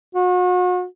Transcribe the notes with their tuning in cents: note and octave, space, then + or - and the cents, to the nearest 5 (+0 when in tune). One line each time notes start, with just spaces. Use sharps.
F#4 -40